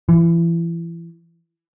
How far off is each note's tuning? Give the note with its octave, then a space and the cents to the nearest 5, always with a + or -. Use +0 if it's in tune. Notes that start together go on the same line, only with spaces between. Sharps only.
E3 +30